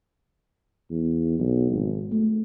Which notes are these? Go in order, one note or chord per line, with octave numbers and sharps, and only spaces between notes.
E2
B1
G#1
A3